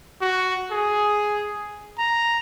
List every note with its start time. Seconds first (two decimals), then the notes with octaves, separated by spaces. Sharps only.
0.21 F#4
0.71 G#4
1.98 A#5